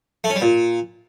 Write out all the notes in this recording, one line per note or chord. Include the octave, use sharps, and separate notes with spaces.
A3
C#4
G3
A#2